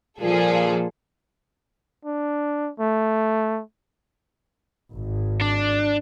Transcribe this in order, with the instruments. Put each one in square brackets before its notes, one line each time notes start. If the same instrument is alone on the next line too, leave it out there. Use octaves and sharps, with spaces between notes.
[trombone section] A#2 [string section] F3 G#4 A4
[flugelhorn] D4
A3
[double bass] G#1 G#2
[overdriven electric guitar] D4